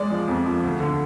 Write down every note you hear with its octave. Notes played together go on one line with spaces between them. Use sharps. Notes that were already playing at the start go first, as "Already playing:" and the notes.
Already playing: G#3 D5
F3
F2
F3
D2
D3